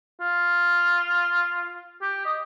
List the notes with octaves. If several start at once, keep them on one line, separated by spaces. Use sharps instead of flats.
F4
G4
D#5